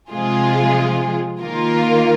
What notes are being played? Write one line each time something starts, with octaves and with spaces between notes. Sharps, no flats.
C3 F3 G#3 F4 G#4
D#3 A#3 F4 A#4